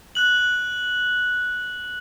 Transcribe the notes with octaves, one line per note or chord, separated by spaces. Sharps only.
F#6 F#7